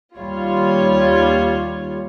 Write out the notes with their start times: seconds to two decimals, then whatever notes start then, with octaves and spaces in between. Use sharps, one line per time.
0.19 D#2 G3 F4 C#5